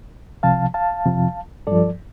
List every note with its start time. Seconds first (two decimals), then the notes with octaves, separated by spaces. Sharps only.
0.43 C2 C3 F3 F5 A5
0.74 F5 A5
1.05 F2 C3 F3
1.67 G2 F3 A4 D5